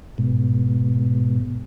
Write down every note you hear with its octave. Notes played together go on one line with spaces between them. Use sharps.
G#2 B2